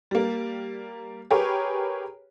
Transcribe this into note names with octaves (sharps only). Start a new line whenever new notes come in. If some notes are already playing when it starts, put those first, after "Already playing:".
G3 A#3
G4 G#4 A#4 B4 C#5